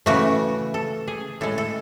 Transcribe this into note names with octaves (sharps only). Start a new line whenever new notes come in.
C#3 E3 A3 F#4
A4
G#4
A2 G#3 A4
A4